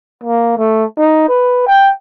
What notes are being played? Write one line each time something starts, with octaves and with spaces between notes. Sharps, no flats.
A#3
A3
D#4
B4
G5